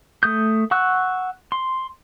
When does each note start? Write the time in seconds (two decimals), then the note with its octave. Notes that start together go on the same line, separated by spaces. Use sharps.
0.23 A3 D#6 G6
0.71 F#5 C#6 E6 F#6
1.52 C6